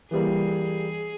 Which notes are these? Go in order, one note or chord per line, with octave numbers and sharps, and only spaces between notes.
E3 G3 A#3 G#4